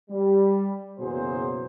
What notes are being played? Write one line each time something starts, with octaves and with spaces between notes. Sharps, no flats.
G3
F#1 B2 E3 F#3 G#4 C5